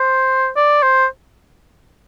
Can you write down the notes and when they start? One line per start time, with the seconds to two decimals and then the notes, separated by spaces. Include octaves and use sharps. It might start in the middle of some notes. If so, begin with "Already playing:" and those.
Already playing: C5
0.56 D5
0.82 C5